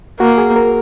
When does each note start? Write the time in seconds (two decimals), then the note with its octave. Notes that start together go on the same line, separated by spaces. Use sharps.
0.19 A#3 F#4
0.38 G#4
0.56 A#4